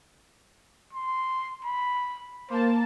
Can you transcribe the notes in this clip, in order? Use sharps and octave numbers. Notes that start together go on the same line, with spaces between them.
C6
B5
A#3 C5 A5